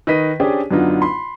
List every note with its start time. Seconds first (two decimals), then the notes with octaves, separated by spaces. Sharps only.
0.07 D#3 B4 D#5 B6 D#7
0.40 C#4 D4 G4 G#4 C5 D5
0.71 F#2 D3 B3 D4 D#4 F4
1.02 B5 C6